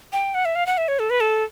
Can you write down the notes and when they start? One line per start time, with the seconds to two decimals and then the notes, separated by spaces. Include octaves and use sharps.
0.13 G5
0.34 F#5
0.45 E5
0.55 F5
0.67 F#5
0.78 E5
0.88 C#5
0.99 A4
1.10 B4
1.21 A4